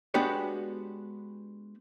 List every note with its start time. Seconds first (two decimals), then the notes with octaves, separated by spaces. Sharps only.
0.14 G#3 B3 D4 F#4 G4 C#5